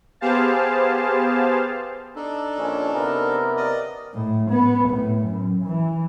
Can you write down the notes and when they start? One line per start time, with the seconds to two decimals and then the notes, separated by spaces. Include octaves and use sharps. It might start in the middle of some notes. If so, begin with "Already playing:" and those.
0.21 B3 G4 G#4 C5 F5 A5
2.16 D4 D#4 A4
2.58 A#1 C#4
2.93 C3 B3 A#4
3.57 D5 D#5
4.14 A2
4.50 B3
4.89 A2
5.24 F#2
5.64 E3